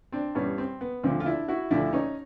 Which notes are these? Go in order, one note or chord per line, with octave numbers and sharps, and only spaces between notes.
C4 D4
G2 E3 G3 B3 C#4
C4
B3
D2 D3 F3 C4
F4
D4 E4
E4 F#4
D2 D3 F3 D4 E4
C#4 D#4